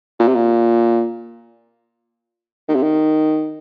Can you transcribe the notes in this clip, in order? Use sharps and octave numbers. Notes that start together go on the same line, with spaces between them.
A#2
C3
A#2
D#3
C3
D#3